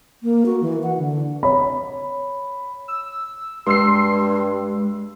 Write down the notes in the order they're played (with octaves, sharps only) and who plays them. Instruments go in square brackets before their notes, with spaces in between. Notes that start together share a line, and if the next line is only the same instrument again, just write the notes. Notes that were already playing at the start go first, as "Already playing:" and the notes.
[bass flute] A#3
F#4
E3
F#5
D3
[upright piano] C#5 B5
[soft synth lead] E6
[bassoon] G2 [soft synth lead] G#3 [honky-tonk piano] C6 E6 C7